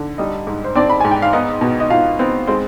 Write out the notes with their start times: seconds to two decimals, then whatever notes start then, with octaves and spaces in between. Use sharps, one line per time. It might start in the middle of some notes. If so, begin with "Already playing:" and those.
Already playing: D3
0.18 G3 D#4 D#5
0.47 G#2
0.64 C5
0.75 C4 D4 D5
0.90 B5
1.01 G#2 G#5
1.11 G5
1.22 F5
1.33 B3 D#4 D#5
1.61 B2
1.80 D#5
1.90 B2 F4 F5
2.19 B3 C4 C5
2.47 G#3 C4 C5